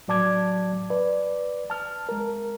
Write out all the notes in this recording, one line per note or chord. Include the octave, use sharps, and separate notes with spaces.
A2 F#3 D5 A5 D6 G#6
B4 D5
A5 F6
G#3 A#4